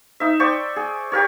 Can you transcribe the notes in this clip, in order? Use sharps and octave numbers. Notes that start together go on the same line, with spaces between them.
D#4 E5
C5 D5 G5 C#6
G#4
G4 A#4 C#5